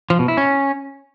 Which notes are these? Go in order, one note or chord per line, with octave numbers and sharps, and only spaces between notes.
F3
B2
E4
C#4